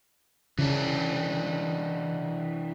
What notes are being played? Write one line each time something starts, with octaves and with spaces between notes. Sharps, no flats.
C#3 E3 D4